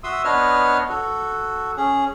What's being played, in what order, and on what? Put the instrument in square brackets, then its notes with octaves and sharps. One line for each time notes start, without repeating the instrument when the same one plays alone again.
[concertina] F#4 E5 C6 D#6 E6
B3 D4 B4 C#5 D#5 F6
F#4 A4
C#4 G#4